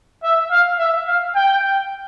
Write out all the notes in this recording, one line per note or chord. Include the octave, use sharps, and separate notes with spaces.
E5
F5
E5
F5
G5